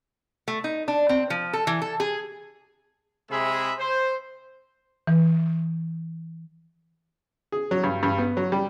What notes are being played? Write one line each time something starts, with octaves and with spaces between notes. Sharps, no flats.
A3
D#4
D4
C4
F3
A4
E3
A4
G#4
C3 G#3 G#4 E5 B5
C5
E3
G#4
F#3
G2
G2
B3
F#3
G3